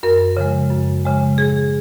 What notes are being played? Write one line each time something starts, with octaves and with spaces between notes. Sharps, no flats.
F#2 A#4
C#3 F3 G#3
F#2
C#3 F3 G#3
A2 G#4